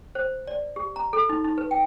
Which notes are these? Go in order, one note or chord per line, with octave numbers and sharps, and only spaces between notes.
C5
D5
G4
A#5
A4
D#4
D#4
B4
G5